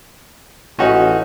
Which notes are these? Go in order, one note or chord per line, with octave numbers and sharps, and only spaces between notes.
A1 C#4 D#4 F#4